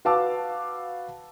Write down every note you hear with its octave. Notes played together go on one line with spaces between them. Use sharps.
F#4 B4 F5 A5 D6 E6